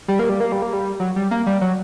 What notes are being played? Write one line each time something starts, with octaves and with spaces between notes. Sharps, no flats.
G3
A#3
G3
A#3
G3
A#3
G3
F#3
G3
A#3
G3
F#3